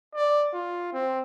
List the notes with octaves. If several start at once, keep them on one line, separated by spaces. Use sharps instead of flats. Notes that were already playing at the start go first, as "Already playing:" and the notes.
D5
F4
C4